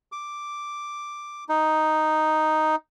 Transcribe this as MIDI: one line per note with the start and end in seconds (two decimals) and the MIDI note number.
0.12 1.44 86
1.49 2.76 63